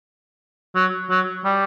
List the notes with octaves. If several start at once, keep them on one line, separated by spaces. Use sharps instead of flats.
F#3
F#3
G3